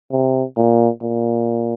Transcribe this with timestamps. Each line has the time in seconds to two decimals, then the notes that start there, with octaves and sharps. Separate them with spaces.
0.11 C3
0.57 A#2
1.03 A#2